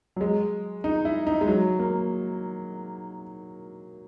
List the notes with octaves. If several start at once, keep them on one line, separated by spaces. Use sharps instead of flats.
F#3
G#3
D#4
E4
D#4
G#3
F#3
A#3